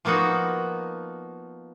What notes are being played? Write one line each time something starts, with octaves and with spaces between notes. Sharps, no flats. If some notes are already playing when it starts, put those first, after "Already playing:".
F3 A#3 B3 D#4 F#4